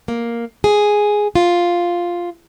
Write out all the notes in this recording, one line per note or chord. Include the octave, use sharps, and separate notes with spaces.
A#3
G#4
F4